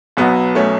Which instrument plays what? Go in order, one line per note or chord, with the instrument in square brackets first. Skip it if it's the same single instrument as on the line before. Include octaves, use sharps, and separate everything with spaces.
[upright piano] B1 B2 F#3 B3
A3 C#4